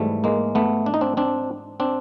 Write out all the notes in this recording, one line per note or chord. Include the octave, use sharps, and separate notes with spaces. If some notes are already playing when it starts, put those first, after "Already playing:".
Already playing: G#2 E3 G3 A3
G#3 A#3
A3 B3
D4
D#4
C4 D4
C4 D4
C4 D4